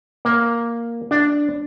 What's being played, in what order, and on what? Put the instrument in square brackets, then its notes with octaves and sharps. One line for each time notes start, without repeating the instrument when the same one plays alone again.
[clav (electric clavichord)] A#3
D4